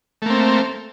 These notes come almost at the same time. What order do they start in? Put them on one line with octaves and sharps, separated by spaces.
A3 A#3 C4